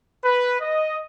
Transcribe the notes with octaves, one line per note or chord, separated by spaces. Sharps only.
B4
D#5